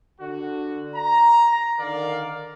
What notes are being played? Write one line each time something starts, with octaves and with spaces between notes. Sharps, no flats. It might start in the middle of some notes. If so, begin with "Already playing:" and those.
D3 F#4
A#5
D3 D#3 A#4 D5 F5